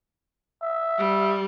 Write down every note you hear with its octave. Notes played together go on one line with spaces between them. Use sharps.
E5
G3